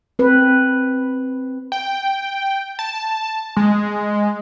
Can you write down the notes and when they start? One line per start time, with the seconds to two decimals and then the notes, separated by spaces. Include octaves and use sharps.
0.19 C4 B4
1.72 G5
2.79 A5
3.57 G#3